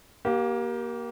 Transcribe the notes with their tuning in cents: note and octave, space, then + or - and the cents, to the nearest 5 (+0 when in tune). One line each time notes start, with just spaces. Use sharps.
A#3 +20 G4 -20